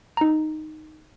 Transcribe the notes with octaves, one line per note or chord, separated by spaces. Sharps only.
D#4 A#5